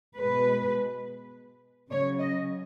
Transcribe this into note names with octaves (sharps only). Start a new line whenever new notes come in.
B2 G#3 B4
C#3 F#3 C#5
D#5